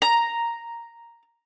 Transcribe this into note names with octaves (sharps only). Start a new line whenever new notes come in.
A#5